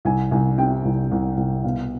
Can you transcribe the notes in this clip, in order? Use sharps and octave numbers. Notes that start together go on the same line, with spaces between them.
C2 G#5
C2 G#5
C3 G5
C2
C2
C2
B2 F5